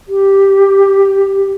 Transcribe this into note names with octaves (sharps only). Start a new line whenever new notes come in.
G4